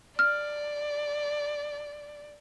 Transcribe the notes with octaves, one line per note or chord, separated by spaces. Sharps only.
D5 F6